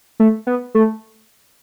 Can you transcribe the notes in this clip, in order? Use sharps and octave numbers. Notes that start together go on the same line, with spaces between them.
A3
B3
A3